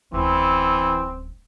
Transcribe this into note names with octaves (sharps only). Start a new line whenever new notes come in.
D1 E3 C4 C#4